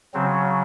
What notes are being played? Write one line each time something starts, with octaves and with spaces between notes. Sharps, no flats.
C#3 F#3 C4